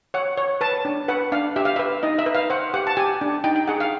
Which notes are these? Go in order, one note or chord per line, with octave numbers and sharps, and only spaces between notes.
C#5 F#5
C#5
B4 A5
D4
B4 F#5
D4 F5
G4 E5
F5
E5
B4
D#4 D#5
E5
B4
F5
C5 F#5
G4 F#5
A5
G4 G#5
D4
D#4 G5
G5
G#4 F#5
F5